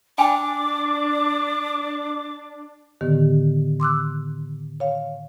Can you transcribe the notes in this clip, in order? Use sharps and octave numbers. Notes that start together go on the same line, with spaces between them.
D4 G5 G#5 B5 D6
A2 D3 D#3 B3 G4
C6 D6 E6 F#6
C#5 F5